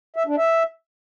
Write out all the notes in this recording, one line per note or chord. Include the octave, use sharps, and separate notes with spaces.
E5
D4
E5